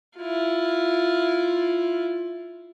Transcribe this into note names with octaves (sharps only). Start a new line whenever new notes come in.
E4 F4